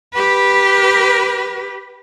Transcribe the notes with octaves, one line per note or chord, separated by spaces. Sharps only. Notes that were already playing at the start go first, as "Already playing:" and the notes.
G4 B4